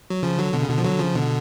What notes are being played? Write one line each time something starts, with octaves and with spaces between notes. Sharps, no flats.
F#3
C#3 F3
D3 F#3
B2 D3
C#3
B2 D3
F3
D3 F#3
C#3 F3
B2 D3